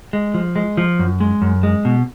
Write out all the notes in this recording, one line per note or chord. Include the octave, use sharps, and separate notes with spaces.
G#3
F3
G#3
F3
F#2
G#3
F#2
G#3
B2